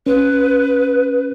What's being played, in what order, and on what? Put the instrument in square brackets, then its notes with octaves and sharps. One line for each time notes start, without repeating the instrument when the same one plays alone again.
[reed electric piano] C#4 [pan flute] B4